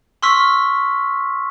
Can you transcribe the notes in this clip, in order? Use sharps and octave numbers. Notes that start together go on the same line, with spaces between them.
C6 C#6 E6 F6 B6